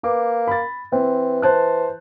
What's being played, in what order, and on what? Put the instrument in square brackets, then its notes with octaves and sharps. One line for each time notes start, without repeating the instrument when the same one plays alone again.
[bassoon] A#3 [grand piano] B4 D6
[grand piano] B5 A6
[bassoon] E3 [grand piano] C4
[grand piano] C5 A5 F#6